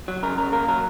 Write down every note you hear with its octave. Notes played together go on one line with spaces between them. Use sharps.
F#3
C#3 A#4
C#3 A#4
A#3 A#4
F#3 A#4